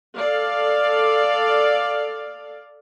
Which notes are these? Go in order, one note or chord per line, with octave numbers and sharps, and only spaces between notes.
A4 D5 F5